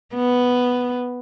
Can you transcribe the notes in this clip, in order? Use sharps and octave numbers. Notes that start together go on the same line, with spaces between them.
B3